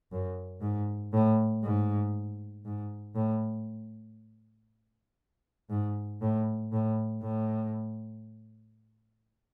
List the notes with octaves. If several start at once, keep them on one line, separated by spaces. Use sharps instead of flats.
F#2
G#2
A2
G#2
G#2
A2
G#2
A2
A2
A2